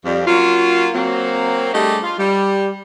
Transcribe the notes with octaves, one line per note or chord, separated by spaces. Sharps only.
F2 G3
F#3 A#3 C#4 F4
F#3 A#3 C4
G3 A3 D4 G4 G#4 D#5
F4
G3